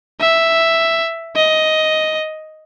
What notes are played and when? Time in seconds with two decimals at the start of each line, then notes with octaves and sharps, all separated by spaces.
0.20 E5
1.36 D#5